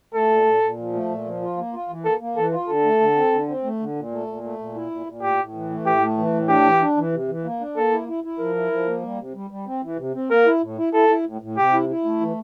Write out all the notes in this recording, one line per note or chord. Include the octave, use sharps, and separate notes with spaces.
A3 A4
A#2
A#2
A#2
F3
A3
A#2
F3
F4
A#3
F4
E3
A#3 A4
A#3
E3 A4
F4
D3 A4
A3
D3
C4
D3
C4
A3
D3
A#2
A3
A#2
A3
A#2
E4
A#2
A#2
A2 G4
A2
E3
A3
A2 G4
A3
E3
A2
D4 G4
E3
D4
E3
C3
E3
A#3
D4
A#3 A4
E4
E4
E4
F3 A#4
E4
F3
A#3
G3
C3
G3
G3
C4
E3
C3
C4
A#3 A#4
E4
A2
E4
E4 A4
E4
A2
A2
C3 G4
E4
E4
A3
E3